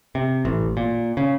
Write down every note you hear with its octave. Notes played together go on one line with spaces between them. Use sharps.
C3
A1
A#2
C#3